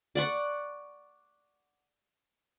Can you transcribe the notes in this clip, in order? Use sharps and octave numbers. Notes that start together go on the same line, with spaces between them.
D5 F#5 C#6